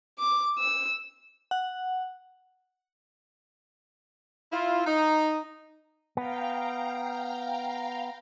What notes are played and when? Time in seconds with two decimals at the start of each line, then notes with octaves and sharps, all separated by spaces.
0.19 D6
0.59 E6
1.51 F#5
4.53 E4 F4
4.86 D#4
6.17 B3 F5 G5 A#5